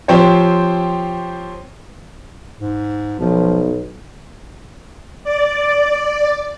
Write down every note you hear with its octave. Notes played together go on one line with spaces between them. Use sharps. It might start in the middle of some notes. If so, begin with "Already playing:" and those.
F3 C4 G4 C5 C#5
G#2
B1 F3
D5